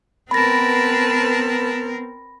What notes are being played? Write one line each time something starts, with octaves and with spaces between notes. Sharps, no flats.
B3 C4 A#4 B4 A5 B5 A#6